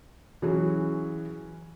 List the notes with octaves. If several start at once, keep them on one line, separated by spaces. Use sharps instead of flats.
E3 F#3 C#4 F#4 G#4